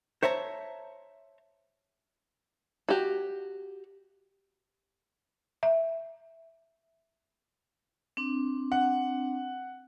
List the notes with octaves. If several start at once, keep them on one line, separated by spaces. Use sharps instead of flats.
C5 C#5 E5 A5 A#5
F#4 G4
E5
C4 D4
F#5